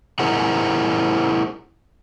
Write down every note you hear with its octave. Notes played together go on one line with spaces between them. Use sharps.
E4 G#4 A#4 C5 F#5